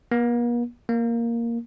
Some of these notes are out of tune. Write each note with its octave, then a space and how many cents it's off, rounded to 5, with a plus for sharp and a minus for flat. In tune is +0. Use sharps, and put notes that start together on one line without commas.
A#3 +45
A#3 +0